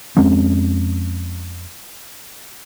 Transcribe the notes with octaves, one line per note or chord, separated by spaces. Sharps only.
F2 G#3 C4 C#4